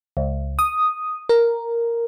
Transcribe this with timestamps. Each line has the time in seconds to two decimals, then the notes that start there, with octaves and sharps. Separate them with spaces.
0.17 C#2
0.59 D#6
1.29 A#4